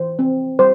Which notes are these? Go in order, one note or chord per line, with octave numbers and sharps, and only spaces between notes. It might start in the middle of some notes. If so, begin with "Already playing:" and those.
Already playing: E3 C5
C4
G3 C5